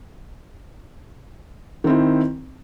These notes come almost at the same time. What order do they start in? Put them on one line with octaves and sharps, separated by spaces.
D#3 C4 E4